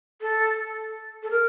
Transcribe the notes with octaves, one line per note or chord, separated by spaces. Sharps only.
A4
A4
A#4